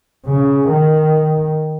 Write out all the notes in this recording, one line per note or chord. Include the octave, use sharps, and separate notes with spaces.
C#3
D#3